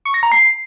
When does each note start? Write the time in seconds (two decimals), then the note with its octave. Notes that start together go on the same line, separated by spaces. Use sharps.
0.05 C#6
0.14 A#6
0.23 A#5
0.32 C7